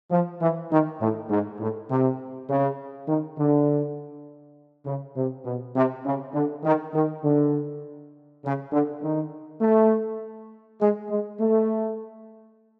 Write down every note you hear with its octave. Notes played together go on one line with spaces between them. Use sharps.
F3
E3
D#3
A2
G#2
A2
C3
C#3
D#3
D3
C#3
C3
B2
C3
C#3
D3
D#3
D#3
D3
C#3
D3
D#3
A3
G#3
G#3
A3